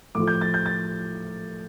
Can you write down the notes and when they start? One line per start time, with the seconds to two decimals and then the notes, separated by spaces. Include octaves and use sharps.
0.15 A2 F3 A3 F4 D6
0.27 G6
0.41 A6
0.54 G6
0.66 A6